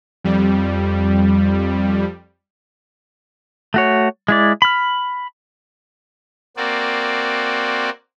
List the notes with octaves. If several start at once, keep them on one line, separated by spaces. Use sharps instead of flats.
F2 G3
A3 F#4 C#5
G#3 E4 D5
B5 F6
A#3 C4 F#4 D5